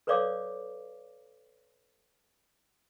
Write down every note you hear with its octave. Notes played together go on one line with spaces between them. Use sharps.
A4 B4 C#5 D5 F5 D6